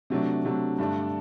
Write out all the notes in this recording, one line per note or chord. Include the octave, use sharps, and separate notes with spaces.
C3 F#3 A3 D4
C3 F#3 A3 D4
G2 D3 A3 D4